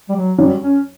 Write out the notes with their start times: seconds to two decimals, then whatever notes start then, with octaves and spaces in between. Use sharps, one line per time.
0.09 G3
0.16 F#3
0.38 F#2 F#3 G3
0.61 C#4